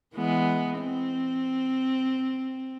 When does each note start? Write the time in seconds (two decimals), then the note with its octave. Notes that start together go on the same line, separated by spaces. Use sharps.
0.15 E3 G#3 B3
0.80 C4